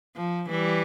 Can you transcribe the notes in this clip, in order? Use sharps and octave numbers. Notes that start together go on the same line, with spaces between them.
F3
E3 G3